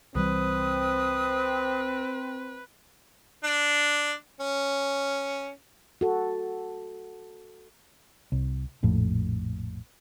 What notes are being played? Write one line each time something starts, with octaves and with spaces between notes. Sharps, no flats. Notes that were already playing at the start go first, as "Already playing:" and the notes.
C2 E3 G3 C4 B4 D#6
D4
C#4
F#4 A4
C2
A#1 F2 A2